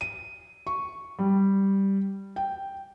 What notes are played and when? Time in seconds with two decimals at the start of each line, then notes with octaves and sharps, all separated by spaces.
0.01 D#7
0.67 C#6
1.19 G3
2.36 G5